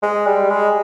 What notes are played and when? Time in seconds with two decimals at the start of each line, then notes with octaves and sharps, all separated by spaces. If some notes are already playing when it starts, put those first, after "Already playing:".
0.03 G#3
0.27 G3
0.50 G#3